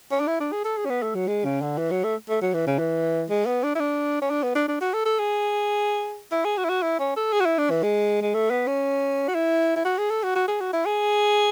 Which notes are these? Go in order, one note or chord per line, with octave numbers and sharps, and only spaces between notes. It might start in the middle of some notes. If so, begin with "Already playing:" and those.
C#4
D4
E4
D4
G#4
A4
G#4
C#4
B3
A3
F#3
G#3
C#3
D3
E3
F#3
A3
A3
F#3
E3
C#3
E3
G#3
B3
D4
E4
D4
C#4
D4
B3
D4
D4
F#4
A4
A4
G#4
E4
G#4
F#4
E4
F#4
E4
C#4
A4
G#4
F#4
E4
D4
E3
G#3
G#3
A3
B3
C#4
F#4
E4
E4
F#4
G#4
A4
F#4
F#4
G#4
F#4
E4
G#4